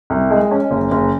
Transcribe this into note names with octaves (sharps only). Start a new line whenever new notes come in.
C2
G#3
C#4
F#1
F#1